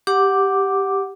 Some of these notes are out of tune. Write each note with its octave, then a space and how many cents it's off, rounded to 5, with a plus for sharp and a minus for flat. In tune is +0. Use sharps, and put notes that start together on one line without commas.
G4 +0 F#5 +0 D6 +0